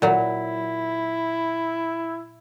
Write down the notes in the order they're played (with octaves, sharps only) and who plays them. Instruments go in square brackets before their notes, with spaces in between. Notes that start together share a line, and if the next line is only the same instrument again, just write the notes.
[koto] A#2 F#3 [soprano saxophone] E4